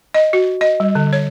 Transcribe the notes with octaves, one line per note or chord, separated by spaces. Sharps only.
D#5
F#4
D#5
G3
D3
C#5